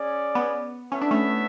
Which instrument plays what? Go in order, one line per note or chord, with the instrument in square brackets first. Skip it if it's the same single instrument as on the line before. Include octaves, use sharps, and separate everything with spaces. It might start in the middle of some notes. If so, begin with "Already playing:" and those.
Already playing: [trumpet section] C#4 G#4 D5
[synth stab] B3
[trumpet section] B3 E4 A4 C#5 E5 [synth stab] C#4
[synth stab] D4
A3 C#4